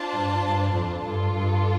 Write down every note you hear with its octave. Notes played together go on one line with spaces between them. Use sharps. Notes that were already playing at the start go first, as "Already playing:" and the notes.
Already playing: D4 F4 C5 A5
G2
G2
F2
G2 D4 F4 A4
G2